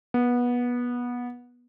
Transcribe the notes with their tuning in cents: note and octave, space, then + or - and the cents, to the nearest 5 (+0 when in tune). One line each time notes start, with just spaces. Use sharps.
B3 -20